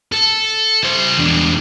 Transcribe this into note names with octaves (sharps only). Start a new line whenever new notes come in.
A4
E4 C5
E2 D4